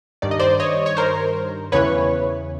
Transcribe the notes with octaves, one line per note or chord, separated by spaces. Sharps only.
G2 D#3 D5
D#5
C5 D5
C#5 D#5
C#5
A#4 C5
E2 C#3 E3 B4 C#5